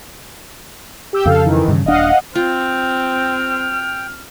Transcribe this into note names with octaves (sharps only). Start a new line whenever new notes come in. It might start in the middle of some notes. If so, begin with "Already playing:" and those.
G4 E6 G6
F2 C#3 A4 F5
D#3 E3
G2 C#3
D#1 D4 D#5 F5 F#5
C4 F4 G5 F6